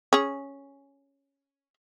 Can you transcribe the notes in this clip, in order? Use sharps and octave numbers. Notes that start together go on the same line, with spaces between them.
C#4 G#4